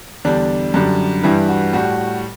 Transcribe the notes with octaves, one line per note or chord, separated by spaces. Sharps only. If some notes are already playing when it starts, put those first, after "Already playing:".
E2 D3 G3 D4
F#2 D3 G3
G2 E3 G3 E4
F#4
A2 G3 F#4